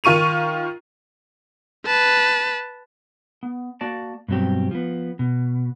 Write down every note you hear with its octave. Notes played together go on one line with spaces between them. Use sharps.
D#3 F4 C#6 D#7 F7
B4 A5
B3
A#3 F#4 D5 A5
G2 B2 F#3 C4 G4
F3 B3
B2